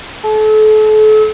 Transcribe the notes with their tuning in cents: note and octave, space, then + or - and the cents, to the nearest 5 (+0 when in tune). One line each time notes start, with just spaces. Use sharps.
A4 -35